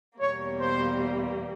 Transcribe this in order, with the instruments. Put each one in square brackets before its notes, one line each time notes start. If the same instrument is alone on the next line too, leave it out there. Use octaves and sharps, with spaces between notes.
[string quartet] E2 B2 G3 A#3 [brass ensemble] C#5
[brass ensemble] C5